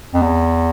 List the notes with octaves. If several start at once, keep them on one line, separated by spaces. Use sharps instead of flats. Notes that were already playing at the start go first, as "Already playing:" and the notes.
F2
E2